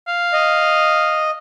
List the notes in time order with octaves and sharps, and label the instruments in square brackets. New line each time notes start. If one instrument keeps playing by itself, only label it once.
[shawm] F5
[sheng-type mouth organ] D#5